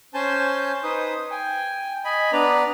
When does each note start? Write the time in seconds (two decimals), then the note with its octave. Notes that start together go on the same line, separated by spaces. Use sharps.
0.14 C#4 C5 G#5 A5 G6
0.83 D#4 B4 C5 D#6
1.31 G5 G#5
2.05 D#5 G#5 B5
2.33 B3 D4 B4 D5 A#5